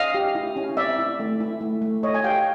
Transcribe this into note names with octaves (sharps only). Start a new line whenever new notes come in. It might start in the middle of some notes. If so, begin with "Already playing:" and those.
Already playing: C#4 D#5 F5
G4
E4
C#4
C4 D5 E5
E4
A3
E4
A3
A3
A3 C#5 D#5
G#5
G4 F5 G5